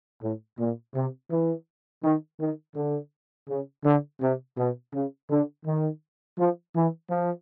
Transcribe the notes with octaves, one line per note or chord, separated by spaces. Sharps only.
A2
A#2
C3
E3
D#3
D#3
D3
C#3
D3
C3
B2
C#3
D3
D#3
F3
E3
F3